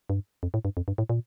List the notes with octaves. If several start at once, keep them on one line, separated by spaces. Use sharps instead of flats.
G2
F2
A2
G2
F2
G2
A2
A#2